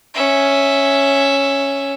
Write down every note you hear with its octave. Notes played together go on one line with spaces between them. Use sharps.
C#4 E5